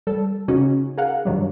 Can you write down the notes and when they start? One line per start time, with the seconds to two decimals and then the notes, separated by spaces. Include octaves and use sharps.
0.07 G3 A4
0.48 C#3 C#4 D#4 F#4
0.98 G#4 A#4 F5 F#5
1.25 G2 D#3 F#3 G3